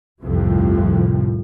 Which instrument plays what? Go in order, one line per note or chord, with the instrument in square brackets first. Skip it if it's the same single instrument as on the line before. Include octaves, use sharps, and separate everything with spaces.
[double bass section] G1 C2 F2 A2 C3 F3